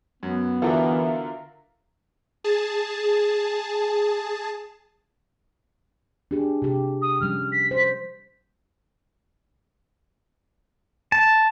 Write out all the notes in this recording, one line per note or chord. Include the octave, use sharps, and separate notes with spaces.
F#2 B3
D3 E3 F4 F#4 A4 A#4 E5
G#4 A5
D4 G4 G#4
C3 G4
D#6
F3 G3 C#4 F6
B6
C5
A5